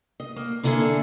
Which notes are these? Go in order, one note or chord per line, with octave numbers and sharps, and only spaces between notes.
D#5
A#3
D3 A#3 E4 G#4 A4 E5